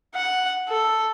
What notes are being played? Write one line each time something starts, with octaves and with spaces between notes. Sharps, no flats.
F#5
A4